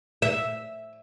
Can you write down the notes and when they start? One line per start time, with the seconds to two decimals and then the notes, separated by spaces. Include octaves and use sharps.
0.22 E5